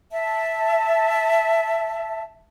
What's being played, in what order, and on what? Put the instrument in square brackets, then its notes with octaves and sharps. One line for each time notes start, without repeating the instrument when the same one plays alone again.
[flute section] E5 A5